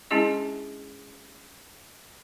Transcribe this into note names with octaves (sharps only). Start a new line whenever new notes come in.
G#3 C#4 D4 E4 G#4 D#5